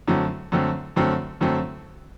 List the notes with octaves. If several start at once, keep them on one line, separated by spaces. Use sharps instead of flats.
F#2 D3 F#3 A3 C4
F#2 D3 F#3 A3 C4
F#2 D3 F#3 A3 C4
F#2 D3 F#3 A3 C4